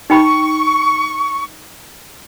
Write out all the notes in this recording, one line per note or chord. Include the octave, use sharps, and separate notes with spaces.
D#4 G5 B5 C#6